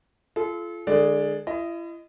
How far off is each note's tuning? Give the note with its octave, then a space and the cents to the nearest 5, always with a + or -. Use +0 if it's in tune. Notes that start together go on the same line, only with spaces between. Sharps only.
F4 -25 A4 -35
D3 +30 G#3 +0 D5 +0
E4 +35 D#5 +0